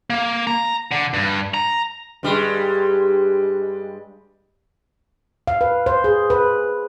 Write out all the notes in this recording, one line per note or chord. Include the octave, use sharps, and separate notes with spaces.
A#3
A#5
D3
G2
A#5
G2 G3 G#3
F5
B4
C5
G#4
B4